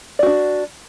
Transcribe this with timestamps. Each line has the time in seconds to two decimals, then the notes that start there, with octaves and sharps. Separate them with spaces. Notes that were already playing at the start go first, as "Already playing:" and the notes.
0.19 D5
0.23 F#4
0.26 D4